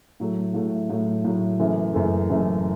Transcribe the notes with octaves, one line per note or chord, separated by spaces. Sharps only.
A2 F#3 A3
A2 F#3 A3
A2 F#3 A3
A2 F#3 A3
F#1 F#2 E3 A3
F#1 F#2 E3 A3
F#1 F#2 E3 A3